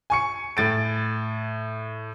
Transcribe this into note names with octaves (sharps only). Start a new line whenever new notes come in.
G#5 C#6 C#7
A2 A6 D7